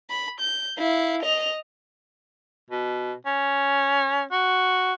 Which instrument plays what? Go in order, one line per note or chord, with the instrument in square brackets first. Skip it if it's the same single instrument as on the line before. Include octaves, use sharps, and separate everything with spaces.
[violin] B5
G6
E4 F5
D#5 F7
[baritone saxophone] B2
C#4
F#4